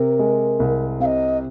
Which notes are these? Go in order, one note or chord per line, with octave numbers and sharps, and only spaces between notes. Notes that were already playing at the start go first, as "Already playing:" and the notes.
Already playing: C3 A#4
G#3
C2
C3 D#5 F5